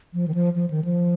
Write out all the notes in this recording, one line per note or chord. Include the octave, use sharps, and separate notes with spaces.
F3
D#3
F3
F3
D#3
F3